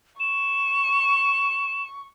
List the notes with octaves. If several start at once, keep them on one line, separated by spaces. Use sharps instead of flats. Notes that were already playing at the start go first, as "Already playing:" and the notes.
C#6 E7